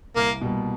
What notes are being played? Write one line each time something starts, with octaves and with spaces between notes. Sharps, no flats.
C2 A#3
B2 G3 A#3